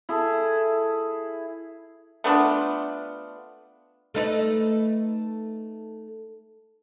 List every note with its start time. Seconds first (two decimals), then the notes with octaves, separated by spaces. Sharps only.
0.09 E4 G#4 A4
2.24 A3 B3 D4 F4
4.15 A3 D#4 B4